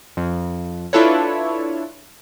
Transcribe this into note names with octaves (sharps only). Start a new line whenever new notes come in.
F2
D4 E4 F4 A4 B4 C#5